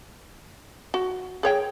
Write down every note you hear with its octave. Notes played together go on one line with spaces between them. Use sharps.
F#4
G#4 C#5 G5